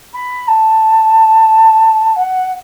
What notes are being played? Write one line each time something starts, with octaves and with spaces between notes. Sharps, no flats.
B5
A5
F#5